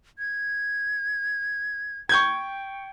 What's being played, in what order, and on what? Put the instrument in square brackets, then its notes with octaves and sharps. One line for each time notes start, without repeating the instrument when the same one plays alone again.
[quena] G#6
[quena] G5 [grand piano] C#6 G6 G#6